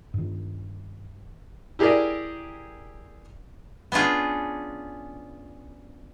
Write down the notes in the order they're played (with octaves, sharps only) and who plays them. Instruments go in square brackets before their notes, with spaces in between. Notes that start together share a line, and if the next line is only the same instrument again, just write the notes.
[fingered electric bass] G2 D#3
[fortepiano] E4 G4 G#4 A#4 D5
[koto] B3 C#4 D4 F4 G#4